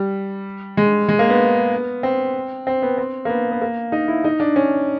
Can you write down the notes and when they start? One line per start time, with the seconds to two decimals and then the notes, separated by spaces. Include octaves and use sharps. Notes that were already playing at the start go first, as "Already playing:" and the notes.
Already playing: G3
0.77 G#3
1.09 G#3
1.19 A#3
1.30 B3
2.03 C4
2.67 C4
2.82 B3
2.98 C4
3.25 A#3
3.29 B3
3.52 B3
3.62 A#3
3.92 D#4
4.08 E4
4.24 D#4
4.40 D4
4.56 C#4